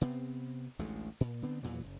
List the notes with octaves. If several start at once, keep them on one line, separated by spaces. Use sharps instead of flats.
C3 B3 C4
A1 D2 G#3 A3
A#2
D3 B3 C4
E2 A#2 E3 F#3
F#1